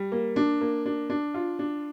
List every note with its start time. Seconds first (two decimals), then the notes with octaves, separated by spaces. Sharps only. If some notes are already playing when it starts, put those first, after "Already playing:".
Already playing: G3
0.12 A#3
0.36 D4
0.61 A#3
0.86 D4
1.10 D4
1.34 F4
1.59 D4